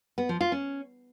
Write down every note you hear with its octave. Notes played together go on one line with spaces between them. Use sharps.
B3
F3
F4
C#4